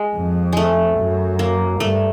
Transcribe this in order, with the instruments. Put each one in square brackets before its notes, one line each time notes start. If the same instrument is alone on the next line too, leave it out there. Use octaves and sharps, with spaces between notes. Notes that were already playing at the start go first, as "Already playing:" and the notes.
Already playing: [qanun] G#3
[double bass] F2
[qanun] G#3 A3
[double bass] F#2
[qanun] A#3
[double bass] G2 [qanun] A3